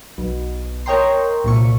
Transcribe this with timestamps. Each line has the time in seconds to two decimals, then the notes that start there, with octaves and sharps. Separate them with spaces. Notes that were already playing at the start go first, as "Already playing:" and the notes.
0.18 B1
0.86 A#4 C#5 D#5 G5 A#5 C6
1.44 C2 A#2 C#6